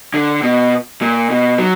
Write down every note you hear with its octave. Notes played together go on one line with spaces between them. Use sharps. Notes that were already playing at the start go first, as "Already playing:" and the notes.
D3
B2
A#2
B2
F#3